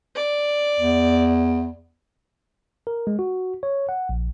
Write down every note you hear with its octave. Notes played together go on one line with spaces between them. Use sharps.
D5
E2
A#4
G#3
F#4
C#5
F#5
A#1